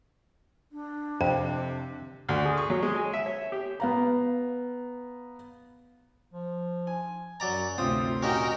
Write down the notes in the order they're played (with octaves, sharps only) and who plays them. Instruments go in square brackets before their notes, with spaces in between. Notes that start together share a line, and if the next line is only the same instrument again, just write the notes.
[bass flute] D4
[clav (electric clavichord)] F2 [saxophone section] C3 [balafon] G5
[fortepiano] D2
G#4
C#6
F#3
G#3
G#5
E5
C#5
G4
[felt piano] B3 F5 A#5
[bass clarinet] F3
[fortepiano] G#5
[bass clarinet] F#2 [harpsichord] F#3 D5 A#5
[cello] D2 C3 [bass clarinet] G2 [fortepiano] C4 F4 [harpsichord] D#6
[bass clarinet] A#2 [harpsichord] C#4 D#4 [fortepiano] F#4 G4 [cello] A#4 G5